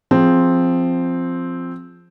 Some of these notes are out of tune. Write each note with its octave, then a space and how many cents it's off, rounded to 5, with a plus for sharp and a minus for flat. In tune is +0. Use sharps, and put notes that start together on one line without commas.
F3 +0 C4 +0 G#4 +0